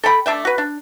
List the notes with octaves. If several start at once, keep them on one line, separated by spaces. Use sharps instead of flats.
A4 G5 B5
A3 D4 E5 G5
F#4 B4
D4